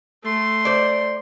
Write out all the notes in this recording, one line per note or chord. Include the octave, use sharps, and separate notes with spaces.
A3 C6
C5 D5